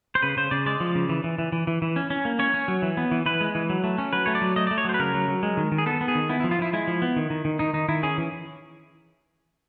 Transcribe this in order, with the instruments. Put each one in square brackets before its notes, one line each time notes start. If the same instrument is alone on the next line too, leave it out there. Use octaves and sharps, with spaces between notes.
[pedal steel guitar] C5
C#3 B4
C#3 C5
C#3 D5
G#3 D5
F3
C#3
E3
E3
E3
E3
E3
E3
C#4
C#4
A#3
C#4 C#5
C#4
F#3
E3
B3
E3
E3 B4
G#3
E3
F#3
A3
C#4
F#3 B4
A3 C#5
D5
F#3
A3 D#5
A3 D5
C#5
F#3 C5
B4
C#3 A#4
F#3
F#3
G#3
D#3
D#3
G#4
B3 A4
B3
G#4
D#3
B3 E4
F3 E4
F4
F3 E4
G#3 E4
F3
B3
D#3
D#3
D#3
D#3 D#4
D#3 D#4
D#3 E4
C#4 G#4
E3